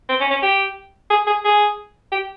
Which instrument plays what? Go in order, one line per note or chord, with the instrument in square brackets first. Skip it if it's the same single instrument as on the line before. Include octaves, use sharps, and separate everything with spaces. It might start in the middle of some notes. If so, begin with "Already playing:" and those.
[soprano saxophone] C4
C#4
C#4
G4
G#4
G#4
G#4
G4